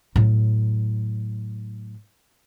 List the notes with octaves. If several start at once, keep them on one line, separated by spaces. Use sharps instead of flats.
A2 F#3